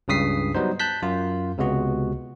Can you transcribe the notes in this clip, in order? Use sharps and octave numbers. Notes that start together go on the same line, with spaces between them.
C#2 G2 C#3 D#6 B6 C7
F#3 G3 B3 D#4 C5
A5 F#6 G6 B6
F#2 F4
C#2 C3 G#3 B3 F#4